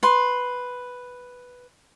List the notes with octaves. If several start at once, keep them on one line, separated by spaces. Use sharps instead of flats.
B4 C6